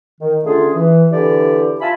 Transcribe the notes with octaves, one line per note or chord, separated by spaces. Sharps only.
D#3
D3 A3 C#4 F4 G#4
E3
D3 E3 E4 G4 D5
F4 E5 G#5 A5 B5